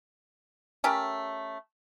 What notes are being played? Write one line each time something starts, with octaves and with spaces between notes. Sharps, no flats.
A3 C#4 G4 A#4